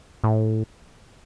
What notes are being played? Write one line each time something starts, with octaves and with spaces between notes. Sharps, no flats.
A2